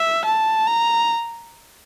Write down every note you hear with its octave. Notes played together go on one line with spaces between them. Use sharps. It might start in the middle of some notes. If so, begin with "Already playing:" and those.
Already playing: E5
A5
A#5